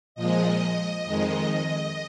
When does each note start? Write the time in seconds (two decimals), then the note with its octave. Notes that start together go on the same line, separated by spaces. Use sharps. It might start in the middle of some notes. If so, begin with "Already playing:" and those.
0.15 A#2 F3 G#3 D#5
1.05 F2 D#3 G#3
1.50 D#5